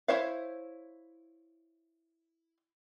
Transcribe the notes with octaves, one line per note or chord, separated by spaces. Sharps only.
E4 C5 C#5 E5 F5